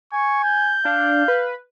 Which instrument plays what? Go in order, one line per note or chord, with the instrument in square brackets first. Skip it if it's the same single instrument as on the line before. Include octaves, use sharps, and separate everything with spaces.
[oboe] G#5 [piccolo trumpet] C#6
[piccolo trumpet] G6
[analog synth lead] D4 [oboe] F5
[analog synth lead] B4